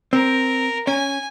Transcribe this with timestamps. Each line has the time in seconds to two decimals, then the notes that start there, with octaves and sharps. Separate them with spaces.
0.13 C4 A#4
0.87 C#4 G#5